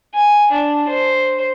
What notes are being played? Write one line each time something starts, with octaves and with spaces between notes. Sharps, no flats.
G#5
D4
C5